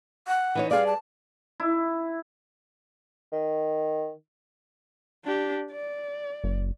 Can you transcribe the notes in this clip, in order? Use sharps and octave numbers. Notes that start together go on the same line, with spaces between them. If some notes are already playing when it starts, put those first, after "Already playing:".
F#5
E3 D#4 C#5
G3 G#4 D5 F5
A5
E4
D#3
D4 G4
D5
F#1